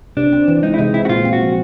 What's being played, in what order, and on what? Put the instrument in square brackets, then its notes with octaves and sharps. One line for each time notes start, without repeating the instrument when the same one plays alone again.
[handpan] C3 [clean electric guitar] D4
[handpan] C4
E3
[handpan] G#3 [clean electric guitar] D#4
[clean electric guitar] E4
[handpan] C3 [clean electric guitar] D#4
[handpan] C4 [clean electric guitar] E4
[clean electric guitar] F#4
[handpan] A#2 [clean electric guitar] F4
[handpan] C4
[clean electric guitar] F#4
[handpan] F3